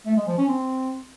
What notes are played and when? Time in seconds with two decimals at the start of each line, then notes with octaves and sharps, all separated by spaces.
0.06 A3
0.17 G#3
0.27 F3
0.38 C#4
0.48 C4